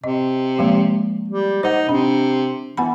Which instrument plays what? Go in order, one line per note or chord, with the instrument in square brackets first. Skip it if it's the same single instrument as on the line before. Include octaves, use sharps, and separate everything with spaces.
[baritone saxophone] C3 [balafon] D#5
[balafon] F3 G#3 A#3
[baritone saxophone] G3
[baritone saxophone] D#4 [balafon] C5 F#5
[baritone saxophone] C3 [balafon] D4
[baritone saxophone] E3 [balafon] B3 F#5 B5